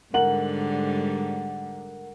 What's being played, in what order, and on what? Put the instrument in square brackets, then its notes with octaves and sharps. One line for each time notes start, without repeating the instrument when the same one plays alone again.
[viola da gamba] G#2 D3 G3 [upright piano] A#4 F#5 F#7